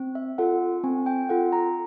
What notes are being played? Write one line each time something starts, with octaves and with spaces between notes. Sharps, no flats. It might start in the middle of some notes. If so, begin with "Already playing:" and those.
Already playing: C4
E5
F4 A4 F#5
C4 G#5
G5
F4 A4 F#5
A#5